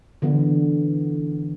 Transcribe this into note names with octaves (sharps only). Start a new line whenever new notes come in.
D3 E3 B3